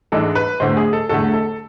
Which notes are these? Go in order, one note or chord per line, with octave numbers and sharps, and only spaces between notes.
G#2 E3 G#3 D4 A4
B4
E2 D3 A3 C5
G#4
A4
E2 D3 A3 A4
A4